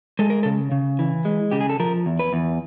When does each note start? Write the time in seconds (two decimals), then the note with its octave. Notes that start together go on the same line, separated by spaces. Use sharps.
0.19 G#3 A4
0.30 A#4
0.43 C#3 A4
0.72 C#3
0.99 E3
1.25 G#3
1.51 C#3 G4
1.61 G#4
1.70 A4
1.80 F3 A#4
2.06 E2
2.19 B4
2.33 E2